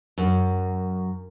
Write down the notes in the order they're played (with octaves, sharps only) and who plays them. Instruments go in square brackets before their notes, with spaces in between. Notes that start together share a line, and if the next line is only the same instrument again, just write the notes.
[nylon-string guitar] F#2